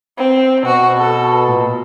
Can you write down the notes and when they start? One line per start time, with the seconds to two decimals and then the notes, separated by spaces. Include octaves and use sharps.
0.18 C4
0.66 B2 F#4
0.98 A4
1.47 A#2